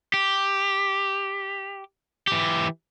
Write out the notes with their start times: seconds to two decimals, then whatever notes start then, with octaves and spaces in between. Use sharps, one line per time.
0.14 G4
2.27 E3 G4